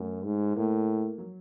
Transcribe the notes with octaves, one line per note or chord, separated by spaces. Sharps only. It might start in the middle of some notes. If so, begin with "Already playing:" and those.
Already playing: F#2 A3
G#2
A2 A#3
F#3